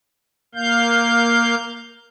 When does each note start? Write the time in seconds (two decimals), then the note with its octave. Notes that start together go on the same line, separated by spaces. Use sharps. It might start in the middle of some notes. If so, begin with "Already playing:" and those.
0.55 A#3 F5 G6